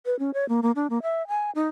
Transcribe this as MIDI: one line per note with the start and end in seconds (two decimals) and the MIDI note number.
0.06 0.18 71
0.19 0.31 61
0.34 0.47 73
0.49 0.60 58
0.63 0.71 58
0.76 0.87 62
0.90 0.99 58
1.02 1.26 76
1.28 1.51 80
1.55 1.69 63